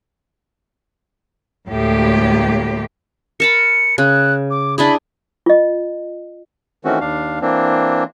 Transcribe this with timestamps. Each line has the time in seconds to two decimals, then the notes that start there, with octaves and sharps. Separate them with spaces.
1.69 D2 A2 G#3 A#3 G4
3.40 A#4 A5 B5 C#7
3.98 C#3 F#6
4.50 D6
4.78 D4 E4 G#4 B5
5.46 F4 D#5
6.85 D#3 E3 A3 C4 C#4 F#4
7.01 D#2 D4 F5
7.41 E3 A#3 C4 D4